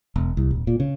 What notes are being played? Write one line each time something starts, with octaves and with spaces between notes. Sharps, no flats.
E1
C2
D#1
A#2
C#3